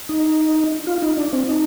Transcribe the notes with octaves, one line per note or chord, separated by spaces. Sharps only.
D#4
F4
D#4
D4
C4
D#4